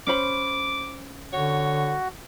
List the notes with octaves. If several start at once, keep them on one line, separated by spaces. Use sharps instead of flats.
C#4 C5 B5 D6
D3 F#4 C#5